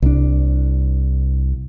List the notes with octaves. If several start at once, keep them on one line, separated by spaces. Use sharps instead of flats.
C2 D4